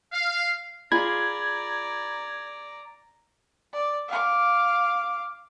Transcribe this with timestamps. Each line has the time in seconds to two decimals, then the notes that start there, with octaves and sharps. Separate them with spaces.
0.13 F5
0.92 F4 G#4 D5 A#5 B5 G#6
3.73 D5
4.08 F5 D6